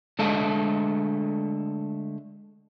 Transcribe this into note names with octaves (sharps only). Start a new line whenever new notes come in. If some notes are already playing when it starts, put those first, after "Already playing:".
D3 G#3 A3 A4 D#5 F5